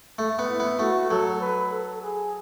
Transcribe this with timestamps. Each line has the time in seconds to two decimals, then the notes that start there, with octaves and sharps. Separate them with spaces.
0.19 A3
0.39 B3
0.49 E4
0.60 B3
0.79 A3 F#4
1.10 F#3 A4
1.41 B4
1.71 A4
2.02 G#4